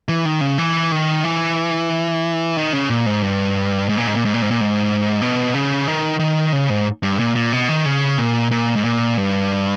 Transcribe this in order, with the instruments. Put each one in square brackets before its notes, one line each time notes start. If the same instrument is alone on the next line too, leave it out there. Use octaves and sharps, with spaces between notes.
[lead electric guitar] E3
D#3
C#3
E3
D#3
E3
D#3
C#3
A#2
G#2
G2
G#2
A#2
G#2
A#2
G#2
A#2
G#2
A#2
G#2
B2
C#3
D#3
D#3
C#3
G#2
G2
A#2
A#2
B2
D#3
C#3
A#2
A#2
G#2
A#2
G2